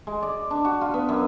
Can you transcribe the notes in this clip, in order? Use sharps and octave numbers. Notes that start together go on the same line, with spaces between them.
G#3
D5
D4
F#4
F4
B3
F#2